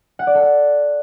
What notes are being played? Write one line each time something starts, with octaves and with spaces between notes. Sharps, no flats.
F#5
D5
A4
F#5